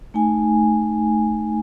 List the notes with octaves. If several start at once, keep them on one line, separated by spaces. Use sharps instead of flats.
A3 D#4 G#5